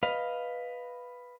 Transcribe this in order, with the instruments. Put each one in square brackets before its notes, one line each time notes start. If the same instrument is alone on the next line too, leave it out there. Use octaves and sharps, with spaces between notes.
[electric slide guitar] B4 D#5 F5